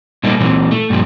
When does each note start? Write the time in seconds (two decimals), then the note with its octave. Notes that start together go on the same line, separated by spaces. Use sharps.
0.23 A#2 G3 A3 A#3 D#4
0.40 A#2 E3 C4
0.71 A3
0.90 G2 A#2 D3 F3 G3